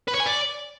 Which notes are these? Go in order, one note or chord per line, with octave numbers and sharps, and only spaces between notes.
B4
C#5
G#5
D5